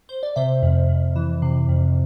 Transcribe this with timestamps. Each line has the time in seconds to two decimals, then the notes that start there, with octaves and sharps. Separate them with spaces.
0.09 C5
0.23 D5
0.36 C3 C5 E5
0.63 F2
0.89 F2
1.16 E3
1.42 C3
1.68 F2